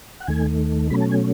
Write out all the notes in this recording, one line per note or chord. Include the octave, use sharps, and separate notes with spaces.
F#5
D#2 D#3 A3 G#5
B2 F#3 A3 C#4 B5
A5
G#5